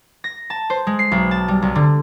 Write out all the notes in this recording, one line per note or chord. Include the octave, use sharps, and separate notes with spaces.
A#6
A5
C5
G#3
C7
B1
A5
G3
C2
D3